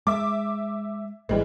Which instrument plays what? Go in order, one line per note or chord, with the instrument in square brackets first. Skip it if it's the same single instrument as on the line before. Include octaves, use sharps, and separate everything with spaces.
[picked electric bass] G#3 [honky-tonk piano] E5 D6
[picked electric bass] G#1 [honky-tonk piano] E3 G3 G#3